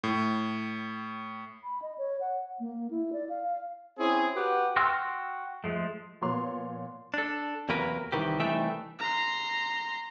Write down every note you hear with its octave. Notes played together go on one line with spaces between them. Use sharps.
A2
B5
D#5
C#5
F#5
A#3
E4
D5
F5
C4 C#4 E4 G#4
F#4 G4 B4 F#5
F#4 G5 C6 E6 F6
F3 G#3 A3
A#2 F3 B3 C#5 C6 F7
D4 A4
E2 C3 F#3 A#3 A#4 B4
C2 D#3 E3 G4
C2 E3 A3 D#4 E5 G5
A#5 C6